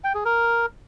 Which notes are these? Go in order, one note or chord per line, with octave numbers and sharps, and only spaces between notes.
G5
G#4
A#4